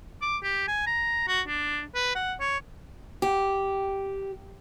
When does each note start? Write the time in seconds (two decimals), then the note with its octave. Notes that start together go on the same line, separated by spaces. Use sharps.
0.22 D6
0.43 G4
0.68 G#5
0.87 A#5
1.28 F#4
1.48 D4
1.95 B4
2.15 F#5
2.41 C#5
3.22 G4